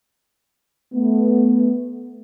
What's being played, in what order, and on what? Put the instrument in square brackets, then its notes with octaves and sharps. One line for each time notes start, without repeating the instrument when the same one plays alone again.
[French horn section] A3 B3